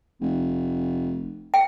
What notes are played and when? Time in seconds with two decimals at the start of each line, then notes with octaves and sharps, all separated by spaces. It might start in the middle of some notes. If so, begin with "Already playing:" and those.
0.21 F1
1.54 G5